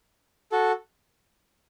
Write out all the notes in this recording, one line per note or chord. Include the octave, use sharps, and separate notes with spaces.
F#4 A4